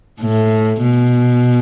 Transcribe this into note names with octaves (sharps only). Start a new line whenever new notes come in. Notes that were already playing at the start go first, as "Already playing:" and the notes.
A2
B2